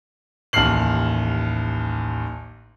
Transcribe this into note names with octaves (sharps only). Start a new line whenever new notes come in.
A1 D#2 A5 F6 C7 F#7